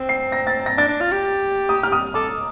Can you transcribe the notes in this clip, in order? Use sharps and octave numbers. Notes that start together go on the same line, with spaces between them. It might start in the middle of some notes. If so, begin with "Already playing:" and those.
Already playing: C4
C7
A#6
A6
A#6
D4 A6
D4
F4
G4
D#6
F6
D#6
A4 D6